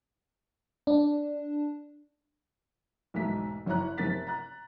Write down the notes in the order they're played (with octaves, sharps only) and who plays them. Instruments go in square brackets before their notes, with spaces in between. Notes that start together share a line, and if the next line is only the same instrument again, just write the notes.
[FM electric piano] D4
[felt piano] B1 E2 G#2 A3 B6
F#1 E4 C#5 A#5 F#6
F#1 C3 A3 A#4 A6 B6
A#5 F#6